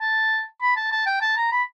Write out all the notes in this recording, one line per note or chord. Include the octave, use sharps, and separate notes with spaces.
A5
B5
A5
A5
G5
A5
A#5
B5